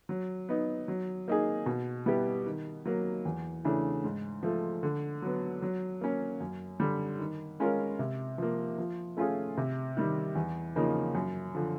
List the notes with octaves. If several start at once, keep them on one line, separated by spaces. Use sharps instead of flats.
F#3
B3 D#4
F#3
A#3 D#4 G#4
B2
G3 B3 E4 G4
D#3
F#3 A#3
E2
C#3 E3 A3 D4
G#2
F3 A3
D3
F#3 B3
F#3
A#3 C#4
F#2
D3 G3
D#3
G#3 C#4 F4 A#4
C3
F3 A#3
F3
A3 C#4 F4 G#4
C3
D#3 G3
E2
C#3 F3 A#3 D#4
F#2
D3 F3